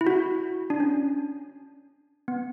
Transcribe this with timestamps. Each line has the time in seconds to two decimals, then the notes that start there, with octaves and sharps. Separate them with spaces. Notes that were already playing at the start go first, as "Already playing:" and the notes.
0.01 E4
0.07 F#4
0.70 D4
0.80 C#4
2.28 B3